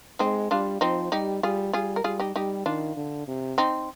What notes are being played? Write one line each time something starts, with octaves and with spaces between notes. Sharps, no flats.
G#3 C4 D#4
G3 D4 F4
F3 C4 D#4
G3 D#4 G4
G3 F4 G#4
G3 F4 G#4
A#4
G3 F4 G#4
D#4 G4
G3 D#4 G4
D#3 D4 F4
D3
C3
C4 D#4